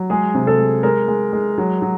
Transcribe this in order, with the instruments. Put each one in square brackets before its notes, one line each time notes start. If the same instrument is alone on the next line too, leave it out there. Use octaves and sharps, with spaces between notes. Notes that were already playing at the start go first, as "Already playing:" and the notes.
Already playing: [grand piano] F#3
G#3 G#4
C3
A4
G#3
G#3 A#4
G#3
G#3
F#3
F#3